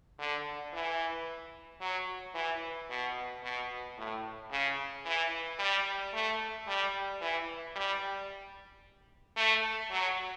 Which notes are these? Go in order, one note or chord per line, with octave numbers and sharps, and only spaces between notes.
D3
E3
F#3
E3
B2
B2
A2
C#3
E3
G3
A3
G3
E3
G3
A3
F#3